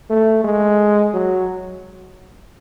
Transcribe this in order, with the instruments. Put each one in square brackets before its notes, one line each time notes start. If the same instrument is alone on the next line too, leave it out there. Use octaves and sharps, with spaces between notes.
[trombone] A3
G#3
F#3